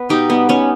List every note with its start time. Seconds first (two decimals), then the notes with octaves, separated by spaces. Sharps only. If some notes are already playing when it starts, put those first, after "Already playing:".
Already playing: B3 B4
0.09 B2 D#4 G4
0.29 G3 B3
0.49 B3 C#4